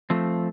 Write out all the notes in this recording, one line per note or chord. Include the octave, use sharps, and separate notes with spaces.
F3 A3 C4